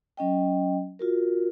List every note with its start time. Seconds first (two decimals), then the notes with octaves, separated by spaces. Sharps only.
0.17 F#3 C#4 D#5 G5
0.99 F4 F#4 A#4